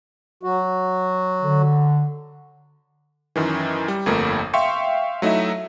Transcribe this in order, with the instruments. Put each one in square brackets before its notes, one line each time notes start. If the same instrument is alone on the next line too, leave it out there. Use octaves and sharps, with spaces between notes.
[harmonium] F#3 F#4
[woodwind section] D3
[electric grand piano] F#2 D#3 E3
G3
G1 F2 A3 A#3 A#4
E5 F5 G5 C6 C#6 C#7
F#3 A3 D#4 E4 E5